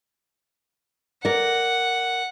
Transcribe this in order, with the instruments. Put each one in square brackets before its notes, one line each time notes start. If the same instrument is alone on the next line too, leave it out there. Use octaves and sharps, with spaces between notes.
[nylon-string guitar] A#4 D5 [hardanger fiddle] F#5